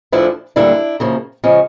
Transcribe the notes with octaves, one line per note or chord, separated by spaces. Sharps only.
D2 D3 F3 D4 E4
D2 D3 G3 A#3 D4 E4
F#2 C#3 F3 A#3
C#3 F3 G#3 C#4